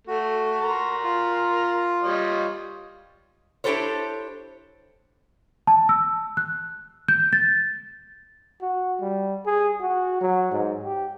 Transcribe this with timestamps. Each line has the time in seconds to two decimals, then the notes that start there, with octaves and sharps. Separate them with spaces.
0.07 A3 F#4
0.61 A#4 A#5 C6
1.04 F4
2.03 G3 C#5 D#5
3.64 D4 E4 G4 A4 C5 C#5
5.67 A5
5.89 E6
6.37 F#6
7.08 G6
7.33 A6
8.62 F#4
9.01 G3
9.46 G#4
9.81 F#4
10.21 F#3
10.51 G#2
10.83 G4